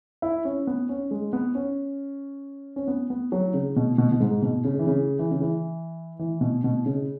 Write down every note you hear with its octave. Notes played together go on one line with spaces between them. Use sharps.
E4
C#4
B3
C#4
G#3
B3
C#4
C#4
B3
B3
F#3
C#3
B2
B2
B2
G#2
B2
C#3
E3
C#3
E3
C#3
E3
E3
B2
B2
C#3